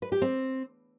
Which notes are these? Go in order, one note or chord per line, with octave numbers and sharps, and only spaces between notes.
B4
G4
C4